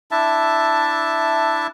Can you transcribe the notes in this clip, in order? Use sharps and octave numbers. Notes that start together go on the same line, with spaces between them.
D4 E4 E5 A5